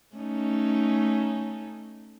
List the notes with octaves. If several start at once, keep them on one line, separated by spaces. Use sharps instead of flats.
A3 C#4 D#4